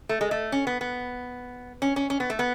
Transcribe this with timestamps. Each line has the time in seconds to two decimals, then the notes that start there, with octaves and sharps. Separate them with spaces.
0.09 A3
0.21 G#3
0.31 A3
0.52 C#4
0.67 B3
0.81 B3
1.82 C#4
1.96 C#4
2.10 C#4
2.20 B3
2.30 A3
2.39 B3